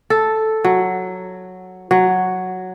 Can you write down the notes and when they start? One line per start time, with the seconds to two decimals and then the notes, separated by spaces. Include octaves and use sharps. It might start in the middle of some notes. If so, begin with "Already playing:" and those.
0.10 A4
0.64 F#3
1.91 F#3